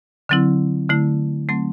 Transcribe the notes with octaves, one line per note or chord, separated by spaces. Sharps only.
D3 F#3 C4 E4
D3 A3 E4
F#3 A3 C4